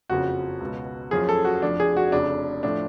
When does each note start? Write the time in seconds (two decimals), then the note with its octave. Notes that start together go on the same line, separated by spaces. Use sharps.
0.10 F#1 F2 C#3 F3 F#4
0.60 C#2 B2
1.11 F#1 F#2 F3 G#4
1.29 A4
1.45 F#4
1.62 F1 F2 F3 D4
1.80 G#4
1.97 F#4
2.12 F1 F2 C#3 D4
2.63 A2 F3 D4